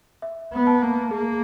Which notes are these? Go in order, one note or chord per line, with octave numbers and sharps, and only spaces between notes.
E5
B3
A5
A#3
A#3 G#4